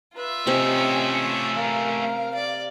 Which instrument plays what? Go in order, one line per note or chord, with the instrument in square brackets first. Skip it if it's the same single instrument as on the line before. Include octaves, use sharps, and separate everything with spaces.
[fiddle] F4 E5 [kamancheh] B4
[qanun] C3 C5 [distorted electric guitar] A3 C#4 [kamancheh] D#5 G#5
[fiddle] A#4 [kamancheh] F5
[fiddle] D5